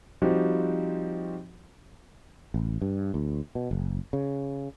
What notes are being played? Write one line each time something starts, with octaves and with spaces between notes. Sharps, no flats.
F3 G3 C4 D#4 F#4 G4
A1
G2
D2
B2
F#1
C#3